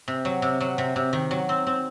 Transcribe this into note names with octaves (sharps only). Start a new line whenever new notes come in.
C3
F#3
C3
F#3
C3
C3
D#3
F#3
C4
C4